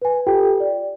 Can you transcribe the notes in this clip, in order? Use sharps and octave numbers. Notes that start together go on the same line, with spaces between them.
B4 G#5
F4 G4 A4 G5
D5